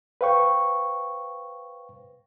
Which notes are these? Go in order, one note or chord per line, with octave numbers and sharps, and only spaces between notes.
B4 C5 F5 G5 C#6